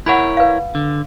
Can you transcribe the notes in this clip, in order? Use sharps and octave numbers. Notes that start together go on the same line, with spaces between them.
E4 A#4 C#5 F#5 A#5 B5
B4 F5
D3